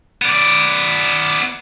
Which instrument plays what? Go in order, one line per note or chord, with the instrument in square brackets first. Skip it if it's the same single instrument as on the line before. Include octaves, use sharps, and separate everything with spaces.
[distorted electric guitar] B3 D5